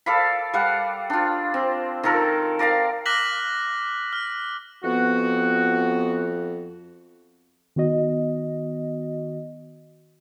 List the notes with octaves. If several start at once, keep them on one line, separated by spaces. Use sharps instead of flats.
A4 D5 F5 B5
G3 F5 F#5
D4 F4
C4
D#3 F4 A4 A#4
A#4 D5 F5 A#5
D6 F6 F#6 A#6 B6 F#7
F6
F2 B3 F#4
D#3 B3 F#4 D#5